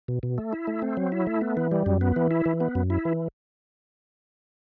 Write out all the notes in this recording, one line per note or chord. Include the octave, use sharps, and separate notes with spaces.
B2
B2
A3
E4
A3
C4
F#3
E4
A3
B3
E3
G3
F#2
B3
E3
E4
E3
B3
F#2
E4
E3